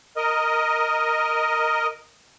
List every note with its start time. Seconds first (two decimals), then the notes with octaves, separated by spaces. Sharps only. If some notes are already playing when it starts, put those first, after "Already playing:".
0.16 A#4 D#5